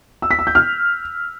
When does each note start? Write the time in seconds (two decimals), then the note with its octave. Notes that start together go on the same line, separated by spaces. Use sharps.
0.22 E6
0.31 B6
0.39 E6
0.47 G6
0.55 F6